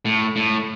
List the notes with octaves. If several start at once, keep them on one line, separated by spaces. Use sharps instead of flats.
A2
A2